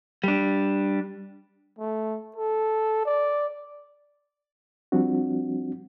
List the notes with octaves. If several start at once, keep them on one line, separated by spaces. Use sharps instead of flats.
G3 D4
A3
A4
D5
F3 G3 C4 D4 F#4